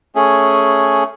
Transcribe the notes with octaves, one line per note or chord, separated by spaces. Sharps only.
A3 C#4 G#4